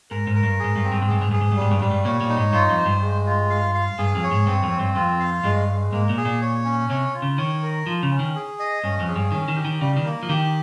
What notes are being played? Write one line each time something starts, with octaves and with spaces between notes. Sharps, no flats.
G#2 A#4
G#2
A#4
G2
G#2 G#4
G2
C4
G2
G#2
G2 G#4
G#2
G2 G#4
G#2
G2
G#2 G3
G2
G#2 G3
G2
A#2 C#5
A#2
D#4
G#2
G2 F4
F2
C5
G2
G#3
F4
F5
F5
G2 G#4
F2
C#5
G#2
G2 C4
F2
C4
G2
F2 F4
F5
G2 G#3
G#3
G#2 A#3
A#2
G#4
A#2
C#5
C#4
C3 C#5
F4
C#3
D#3 C#5
A#4
F3 F4
C#3
C#4
D#3
G#4
D#5
G2 C#4
F2
G#4
G2
D#3 C#4
D#3
G4
D#3
C#3 G3
D#3
A#3
F3
D#3 G4